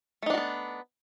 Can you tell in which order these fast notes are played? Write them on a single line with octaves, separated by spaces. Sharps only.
A3 D#4 D4 F#4 B3